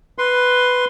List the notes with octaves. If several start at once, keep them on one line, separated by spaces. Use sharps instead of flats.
B4 C6